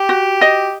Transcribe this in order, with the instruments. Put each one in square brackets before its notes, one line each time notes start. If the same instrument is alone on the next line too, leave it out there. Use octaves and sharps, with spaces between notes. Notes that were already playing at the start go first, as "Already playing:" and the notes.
Already playing: [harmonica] G4
[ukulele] F#4
D#5